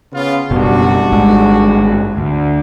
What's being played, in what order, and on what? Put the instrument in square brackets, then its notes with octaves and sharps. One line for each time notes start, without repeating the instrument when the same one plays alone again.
[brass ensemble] C#3 B3 F4
[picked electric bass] F#1 B2 [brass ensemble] G3 D4 F#4
[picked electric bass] G#1 G2 G#3
D2